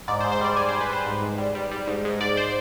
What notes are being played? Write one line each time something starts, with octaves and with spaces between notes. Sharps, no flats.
G#2 D5
C5
G#2
C5
G3 D5
G3 G#5
C5
G3
B4
G3 C5
G#2
G#2
G3
G3
G3
G#2
G#2
G#2 D5
C5